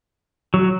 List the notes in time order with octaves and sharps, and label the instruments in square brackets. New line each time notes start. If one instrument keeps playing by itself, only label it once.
[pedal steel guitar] F#3